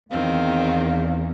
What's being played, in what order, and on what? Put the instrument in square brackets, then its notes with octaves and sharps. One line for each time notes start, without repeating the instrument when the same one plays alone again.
[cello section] E2 [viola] D#3 C4 [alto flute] F5